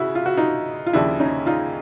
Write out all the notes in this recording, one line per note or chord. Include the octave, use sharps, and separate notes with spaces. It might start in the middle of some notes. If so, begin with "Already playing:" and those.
Already playing: C#3 E4 F#4
F4
F#4
D#4 F4
F4
D#2 C#3 F3 D4 E4
C#4 D#4
D#4 F4